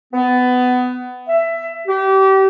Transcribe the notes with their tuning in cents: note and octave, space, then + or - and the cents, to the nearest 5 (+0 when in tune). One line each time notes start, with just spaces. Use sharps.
B3 +20
E5 +15
G4 -30